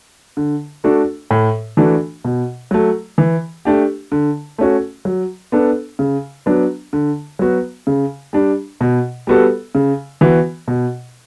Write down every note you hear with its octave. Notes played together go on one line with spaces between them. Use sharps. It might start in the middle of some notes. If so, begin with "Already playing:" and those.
D3
A3 D4 F#4 A4
A2
E3 A3 D4 F#4
B2
F#3 A3
E3
A3 D4 G4
D3
A3 C#4 F#4
F#3
B3 D4 A4
C#3
F#3 B3 D4
D3
F#3 B3 F#4
C#3
G3 D4
B2
G3 B3 F#4 A4
C#3
E3 B3 F#4
B2